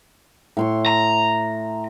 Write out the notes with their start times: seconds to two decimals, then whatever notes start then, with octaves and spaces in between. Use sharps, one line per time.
0.57 A2 C6 C#6
0.86 A#5